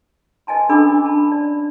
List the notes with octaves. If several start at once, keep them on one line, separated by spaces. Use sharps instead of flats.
B4 D#5 G#5 A5 C6
C#4 D4 A4 B5 D6 E6
A5 B5
D5